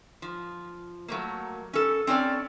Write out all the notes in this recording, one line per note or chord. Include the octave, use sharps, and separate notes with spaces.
F3
F#3 A3 A#3
C#4 A4
C4 C#4 A4 D5